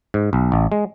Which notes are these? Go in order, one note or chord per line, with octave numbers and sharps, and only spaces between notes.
G#2
B1
A1
G#3